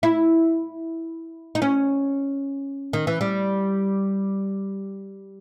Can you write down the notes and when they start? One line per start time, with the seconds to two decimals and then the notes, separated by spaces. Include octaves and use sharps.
0.03 E4
1.55 D#4
1.62 C#4
2.93 D#3
3.07 E3
3.21 G3